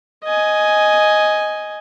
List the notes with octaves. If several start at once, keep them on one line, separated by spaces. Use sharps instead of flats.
D#5 G#5